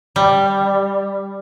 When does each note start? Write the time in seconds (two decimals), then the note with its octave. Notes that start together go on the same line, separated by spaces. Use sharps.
0.16 G3